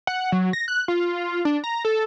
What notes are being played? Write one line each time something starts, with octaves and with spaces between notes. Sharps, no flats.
F#5
F#3
A#6
F#6
F4
D4
A#5
A4